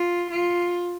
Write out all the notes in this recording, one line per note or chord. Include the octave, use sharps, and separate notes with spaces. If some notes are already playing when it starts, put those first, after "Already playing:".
Already playing: F4
F4